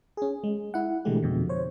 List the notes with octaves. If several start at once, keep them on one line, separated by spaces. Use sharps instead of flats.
C#4 G#4
G#3
E4 F#5
B2 D3 E3 G#3 A3 G4
F2 B2 D3
C5 C#5